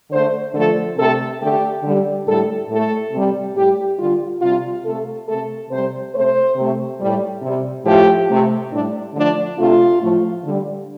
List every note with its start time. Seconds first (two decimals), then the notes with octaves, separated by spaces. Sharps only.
0.11 D3 A3 C5
0.54 D3 F3 A3 A4
0.97 C3 A3 A4
1.40 D3 A3 G4
1.83 D3 G3
2.26 A2 G3 A4
2.69 A2 A3 A4
3.12 C3 G3
3.55 A2 G3 G4
3.98 D3 G3 F4
4.41 C3 G3 F4
4.84 C3 A3 A4
5.27 C3 A3 A4
5.70 C3 G3 C5
6.13 C3 A3 C5
6.56 C3 A3
6.99 A2 G3
7.42 C3 G3
7.85 A2 F3 A3 G4
8.29 C3 A3
8.71 A2 G3 D4
9.14 D3 F3 A3 D4
9.57 C3 A3 F4
10.00 A2 F3 A3
10.43 D3 G3